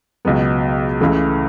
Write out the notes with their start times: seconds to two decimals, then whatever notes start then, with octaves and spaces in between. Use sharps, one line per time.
0.25 C#2 B2 F#3 B3
1.00 C#2 C#3 E3 A3